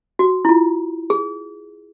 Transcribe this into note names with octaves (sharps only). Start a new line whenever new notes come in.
F#4
E4
F4
G#4